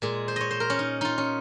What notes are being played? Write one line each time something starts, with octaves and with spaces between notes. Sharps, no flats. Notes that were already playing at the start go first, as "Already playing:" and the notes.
A#2 G#3 G#4
C5
C#5 D#5
C5
A#4
C#4
D#4
D#4 F4
C#4